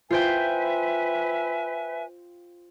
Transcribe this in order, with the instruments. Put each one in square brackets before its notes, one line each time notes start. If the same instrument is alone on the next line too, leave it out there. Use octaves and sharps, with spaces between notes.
[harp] F4 C5 G5 [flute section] B4 E5 G#5